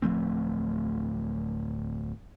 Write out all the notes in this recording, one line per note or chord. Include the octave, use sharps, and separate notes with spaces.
D1 F3 A3 C4